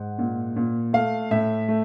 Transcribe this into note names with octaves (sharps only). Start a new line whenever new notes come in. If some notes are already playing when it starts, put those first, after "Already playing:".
Already playing: G#2 F#5
A#2
A#2
A3 F5
A2 E5
A3